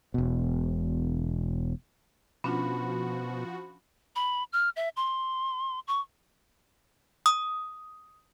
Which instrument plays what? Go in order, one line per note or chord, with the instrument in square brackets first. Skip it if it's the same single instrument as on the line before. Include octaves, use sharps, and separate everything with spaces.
[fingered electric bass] E1 B2
[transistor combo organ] B2 [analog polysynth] F3 F#4 [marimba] C#4 D4 F4 [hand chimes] B5
[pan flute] B5
F6
E5
C6
C#6
[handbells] D#6